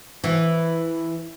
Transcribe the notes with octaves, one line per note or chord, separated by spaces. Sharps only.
E3